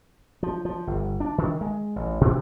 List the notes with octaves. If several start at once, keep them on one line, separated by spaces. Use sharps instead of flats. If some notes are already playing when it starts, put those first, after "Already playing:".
F3
F3
G1
D4
D#3
G#3
A1
B2